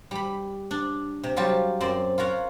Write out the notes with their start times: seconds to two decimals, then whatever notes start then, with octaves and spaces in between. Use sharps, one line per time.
0.11 G3 B5
0.71 D4
1.23 C3
1.36 F#3 G3 F4 G4 E5 A5
1.80 F#2 C4 D5 C6
2.18 F4 A#4 C#5 F#5